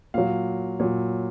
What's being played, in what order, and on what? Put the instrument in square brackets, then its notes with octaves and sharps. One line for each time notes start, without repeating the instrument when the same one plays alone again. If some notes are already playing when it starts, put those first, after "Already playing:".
[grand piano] A#2 F#3 F5
A#2 F#3